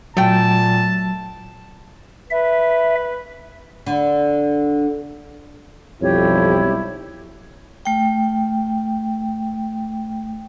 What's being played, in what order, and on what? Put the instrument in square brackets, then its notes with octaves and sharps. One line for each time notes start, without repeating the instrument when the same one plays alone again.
[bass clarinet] A#2 [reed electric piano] F#3 [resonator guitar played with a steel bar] A3 G5 [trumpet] A5
[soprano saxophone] B4 [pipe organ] E5
[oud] D3
[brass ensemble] B1 G3 E4 [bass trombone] F2 [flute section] G4 C#5
[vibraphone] A3 G5